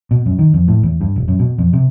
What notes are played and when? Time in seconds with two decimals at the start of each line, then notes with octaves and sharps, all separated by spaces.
0.11 B2
0.26 F#2
0.39 D#3
0.54 F2
0.68 A2
0.83 E2
1.01 G2
1.16 E1
1.28 F#2
1.39 B2
1.58 F2
1.73 C3